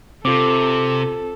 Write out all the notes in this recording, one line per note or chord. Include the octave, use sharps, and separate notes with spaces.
C3 C4 F4 A4 C5 D6